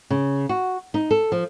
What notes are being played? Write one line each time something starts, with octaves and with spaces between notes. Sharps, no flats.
C#3
F#4
D#4
A4
F3